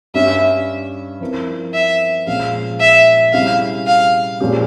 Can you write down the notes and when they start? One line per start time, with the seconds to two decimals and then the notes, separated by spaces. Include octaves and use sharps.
0.14 G2 G3 C#4 E5
1.21 F3 C4 E4 A#4
1.74 E5
2.27 A#2 F3 G#3 C#4 F5
2.81 E5
3.33 C3 G3 C#4 E4 G#4 F5
3.87 F5
4.40 A#2 F3 G#3 C#4 G4